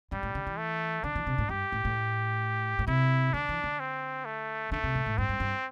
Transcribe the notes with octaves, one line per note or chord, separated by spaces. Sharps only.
G2 G3
A2
D3
E3
A3
D3 D4
E3
C3
A2
G2 G4
A2
A2
A2
C3 E4
D3 D4
E3
D3
C4
A3
D3 A3
C3
A2
A2
G2 C4
G2
G2